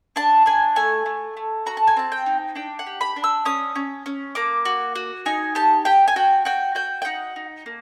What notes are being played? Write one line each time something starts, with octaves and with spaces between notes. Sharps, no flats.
D4 A5
D4 G#5
A3 G#5
A3
A3
F#4 A#5
A5
G#5
C4 A5
G5
D#4
D4 G5
F#5
G4
B5
D4
E6
C#4 D#6
C#4
C#4
A#3 D6
F#4
F#4
D#4 G#5
G4 A5
G4 G5
G#5
F#4 G5
F#4 G5
F#4 G5
G5
D#4 F#5
D#4
A#3